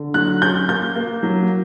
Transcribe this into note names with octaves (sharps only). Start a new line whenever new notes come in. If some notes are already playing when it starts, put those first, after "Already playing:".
Already playing: D3
F#3 F#6
C#4 G6
A#3 G6
A#3
F#3